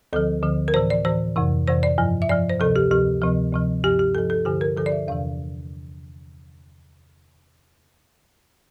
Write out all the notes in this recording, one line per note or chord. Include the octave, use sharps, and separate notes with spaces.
D2 D3 F3 A4
D2 D3 F3
A#4
A2 E3 C5
D5
A2 E3 C5
F2 C3 E3
F2 C3 E3 C5
D5
G2 F3
E5
G2 F3 D5
C5
D2 C3 F3 A4
G4
D2 C3 F3 G4
D2 C3 F3
D2 C3 F3
G2 F3 G4
G4
G2 F3 A4
A4
G2 D3 F3 G4
A#4
G2 D3 F3 A4
D5
E5
E2 C3 E3 F5